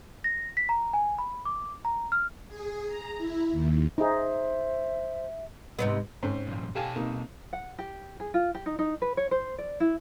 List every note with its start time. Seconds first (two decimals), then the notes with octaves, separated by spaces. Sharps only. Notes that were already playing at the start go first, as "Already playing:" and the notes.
0.24 A#6
0.57 B6
0.69 A#5
0.93 G#5
1.18 B5
1.45 D6
1.85 A#5
2.12 F6
2.48 G#4
2.87 A#5
3.18 E4
3.52 D#2
3.98 D#4 G#4 C5 E5
5.79 G#2 C3 B3 D#5
6.23 G#2 C4 C#4
6.47 G2 A#2 F3
6.75 B2 G4 A4 F5 G#5 A5
6.96 C3 A#3 D#4
7.53 F#5
7.79 G4
8.20 G#4
8.34 F4
8.55 G4
8.66 D#4
8.79 D#4
9.02 B4
9.17 C#5
9.31 C5
9.58 D5
9.80 E4